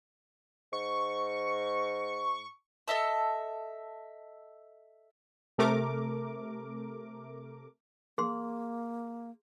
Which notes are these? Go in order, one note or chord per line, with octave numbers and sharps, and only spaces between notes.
G#2 C#6
A4 D#5 E5 A5
C3 A3 A#4 D6
A#3 G#4 C6